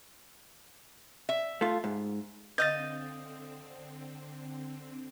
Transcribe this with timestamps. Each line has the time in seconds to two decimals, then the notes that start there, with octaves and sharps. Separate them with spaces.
1.29 E5
1.61 A3 F4
1.84 G#2
2.58 D3 C4 D#5 F5 G6 A6